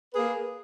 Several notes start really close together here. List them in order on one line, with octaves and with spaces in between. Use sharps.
B4 G#4 A#3